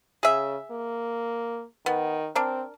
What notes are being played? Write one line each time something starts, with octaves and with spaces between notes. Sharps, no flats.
C#3 G#4 E5
A#3
D#3 B3
C4 D4 A#4